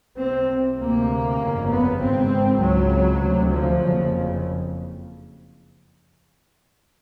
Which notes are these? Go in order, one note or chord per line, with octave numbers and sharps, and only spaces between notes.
C2 C3 C4
D2 C3 A#3
G1 F2 C#3
B3
G#1 G#2 C4
C#2 C#3 F#3
D2 C3
F3
F#1 F2 C#3